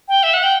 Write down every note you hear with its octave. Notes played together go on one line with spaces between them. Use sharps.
G5
E5
F#5
G5